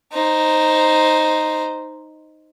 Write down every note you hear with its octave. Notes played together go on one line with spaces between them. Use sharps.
D#4 C5